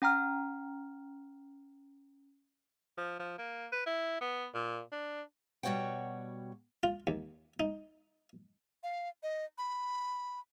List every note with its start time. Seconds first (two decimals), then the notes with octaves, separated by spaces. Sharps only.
0.02 C#4 G5 A#5 F6
2.97 F3
3.19 F3
3.38 A#3
3.72 B4
3.86 E4
4.21 B3
4.54 A#2
4.92 D4
5.63 B2 G3 F#4 C#5 F#5 G5
6.83 F4
7.07 D#2
7.60 D#4
8.83 F5
9.23 D#5
9.58 B5